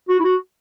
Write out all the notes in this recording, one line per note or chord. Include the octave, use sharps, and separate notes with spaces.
F#4
E4
F#4